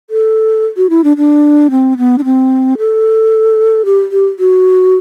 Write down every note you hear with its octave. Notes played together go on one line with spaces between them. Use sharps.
A4
F#4
E4
D4
D4
C4
B3
D4
C4
A4
G4
G4
F#4